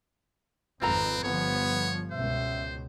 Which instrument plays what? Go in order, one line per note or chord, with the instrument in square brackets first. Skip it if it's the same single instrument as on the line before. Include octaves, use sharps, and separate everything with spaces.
[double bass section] G#1 F2 [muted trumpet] C4 [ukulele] F4 A4 A#5 [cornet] B4
[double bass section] G1 F3 [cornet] B3 [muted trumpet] C#5
[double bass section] C#2 B2 [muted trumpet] C5 [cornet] E5